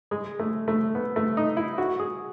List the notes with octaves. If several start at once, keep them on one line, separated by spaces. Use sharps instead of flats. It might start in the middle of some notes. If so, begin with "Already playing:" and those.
G#3
A3
A3
B3
A3
D#4
E4
F#4
G#4